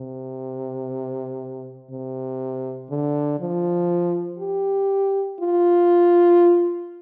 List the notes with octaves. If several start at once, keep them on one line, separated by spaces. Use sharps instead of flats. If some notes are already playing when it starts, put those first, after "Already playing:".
Already playing: C3
C3
D3
F3
G4
F4